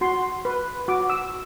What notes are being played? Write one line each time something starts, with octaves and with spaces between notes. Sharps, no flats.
F#4 C6
B4
F#4 D6
E6